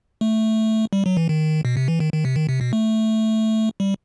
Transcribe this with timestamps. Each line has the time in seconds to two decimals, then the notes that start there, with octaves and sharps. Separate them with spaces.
0.21 A3
0.93 G3
1.06 F#3
1.17 E3
1.29 D#3
1.65 B2
1.77 C3
1.88 E3
2.00 D#3
2.13 D#3
2.25 C3
2.36 D#3
2.49 C3
2.61 B2
2.73 A3
3.80 G3